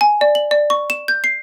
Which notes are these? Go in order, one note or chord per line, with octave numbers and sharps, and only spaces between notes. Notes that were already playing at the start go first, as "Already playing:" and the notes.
G#5
D5
F#7
D5
C#6
E7
G6
C7